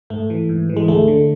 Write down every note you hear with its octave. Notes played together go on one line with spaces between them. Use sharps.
G#2 A3
E3
G#2
E3
G#3
D2 A3
D3